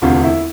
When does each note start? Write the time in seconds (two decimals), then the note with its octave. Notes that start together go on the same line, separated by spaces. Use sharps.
0.02 E1 D2 C3 F4
0.24 E4